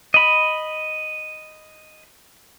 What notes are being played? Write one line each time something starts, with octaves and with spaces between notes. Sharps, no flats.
D#5 B5